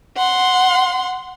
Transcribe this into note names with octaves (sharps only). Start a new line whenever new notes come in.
F#5 C6